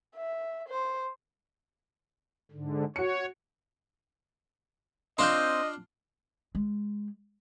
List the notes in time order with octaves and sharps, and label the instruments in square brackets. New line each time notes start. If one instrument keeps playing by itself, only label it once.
[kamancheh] E5
C5
[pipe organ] G#2 D3
[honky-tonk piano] F#4 C#7 [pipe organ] C#5
[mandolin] C4 F#6 G6 [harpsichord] D4 F4 [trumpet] D#5
[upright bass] G#3